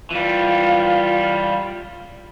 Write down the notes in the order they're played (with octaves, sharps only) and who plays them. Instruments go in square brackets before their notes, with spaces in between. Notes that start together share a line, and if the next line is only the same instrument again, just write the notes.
[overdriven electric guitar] E3 G3 [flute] F4